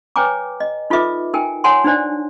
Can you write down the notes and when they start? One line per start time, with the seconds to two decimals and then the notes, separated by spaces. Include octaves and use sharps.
0.16 B4 C#5 G5 G#5 A#5 D6
0.60 D#5
0.90 D#4 F4 A4 B4 E5 D6
1.34 D#4 A#4 G5 G#5
1.64 C#5 F#5 G#5 A5 C6
1.84 D4 D#4 C5 D5